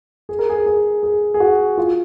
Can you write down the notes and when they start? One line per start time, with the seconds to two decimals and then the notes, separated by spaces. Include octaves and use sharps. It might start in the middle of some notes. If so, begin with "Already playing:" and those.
0.29 G#4
0.39 A#4
0.50 G#4
0.66 G#4
1.03 G#4
1.34 G#4
1.40 F#4
1.78 F4